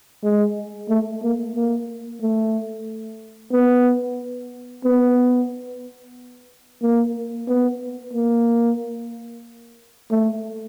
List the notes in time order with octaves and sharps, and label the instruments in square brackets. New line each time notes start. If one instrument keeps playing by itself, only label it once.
[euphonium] G#3
A3
A#3
A#3
A3
B3
B3
A#3
B3
A#3
A3